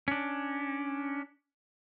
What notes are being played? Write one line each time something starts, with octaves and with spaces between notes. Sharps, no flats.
C#4 D4